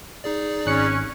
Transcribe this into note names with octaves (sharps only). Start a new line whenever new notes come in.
D#4 G#4 D5
G#1 C#4 F#6 C#7